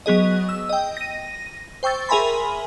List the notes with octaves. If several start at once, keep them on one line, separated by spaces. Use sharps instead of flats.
F#3 B3 G#4 D#5
E6
D#5 G5
A#6 D#7
C5 G5 C#6 E6 A6
G#4 A#4 E5 G#5 B5 C6